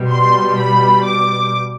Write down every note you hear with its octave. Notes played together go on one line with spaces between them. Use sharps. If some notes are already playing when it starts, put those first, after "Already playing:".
Already playing: B2 G3
C6
B5
D6